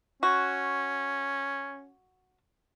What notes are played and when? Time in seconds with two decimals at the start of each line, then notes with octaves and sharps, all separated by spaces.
0.23 C#4 F#4